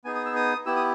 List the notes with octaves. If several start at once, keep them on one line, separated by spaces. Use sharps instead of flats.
B3 D#4 G#4 G#5
D#6
E6
D#6
B3 E4 G4 E6
D#6